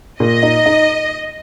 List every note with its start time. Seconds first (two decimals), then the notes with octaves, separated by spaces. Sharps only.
0.20 A#2 D#5
0.43 D#4
0.66 D#4